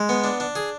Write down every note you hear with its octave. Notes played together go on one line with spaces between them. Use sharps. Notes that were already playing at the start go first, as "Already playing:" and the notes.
Already playing: G#3
B3
D4
D4
G#4